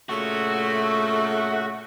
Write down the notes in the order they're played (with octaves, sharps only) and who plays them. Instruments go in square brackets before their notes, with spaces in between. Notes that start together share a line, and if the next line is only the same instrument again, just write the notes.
[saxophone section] A#2 C#3 A3 [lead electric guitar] F#4